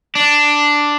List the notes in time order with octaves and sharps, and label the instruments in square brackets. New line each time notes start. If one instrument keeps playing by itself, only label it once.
[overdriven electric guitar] D4